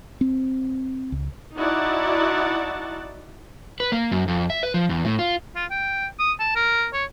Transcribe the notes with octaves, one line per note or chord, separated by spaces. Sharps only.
C4
C#2
D#4 E4 F#4 D5 F#5 A5
B4
A#3
F#2
F2
E5
B4
F3
E2
A2
F4
F4
G5
D#6
A5
A#4
C#5